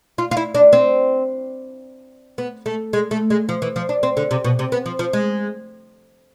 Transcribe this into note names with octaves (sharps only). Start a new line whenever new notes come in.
F4
F4
E4
D4
C4
B3
A3
G#3
A3
G#3
F3
E3
F3
D4
C4
D3
C3
B2
C3
B3
F3
F3
G#3